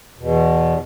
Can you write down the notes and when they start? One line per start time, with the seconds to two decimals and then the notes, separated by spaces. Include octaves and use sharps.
0.18 E2 B2